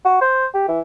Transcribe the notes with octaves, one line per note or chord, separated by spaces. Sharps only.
F#4
C5
G4
E3